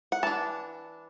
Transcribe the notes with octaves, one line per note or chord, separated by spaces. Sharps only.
F#5
E3 D4 A5